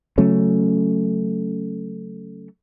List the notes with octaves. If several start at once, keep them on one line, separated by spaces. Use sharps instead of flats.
C#3 F#3 A3 C#4